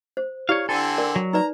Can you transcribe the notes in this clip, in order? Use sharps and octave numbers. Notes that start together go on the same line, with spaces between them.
C5
E4 G4 C#5 D5 F5
D3 C4 A4 G#5
A#4 D5
F#3
D#4 B4 D5 A#5